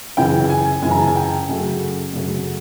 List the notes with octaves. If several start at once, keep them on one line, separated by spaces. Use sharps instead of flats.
F#2 C#3 E3 G5
G#5
F#2 C#3 E3 G#5
A#5
A5
G#5
G5
F#2 C#3 F#3 A3
F#2 C#3 F#3 A3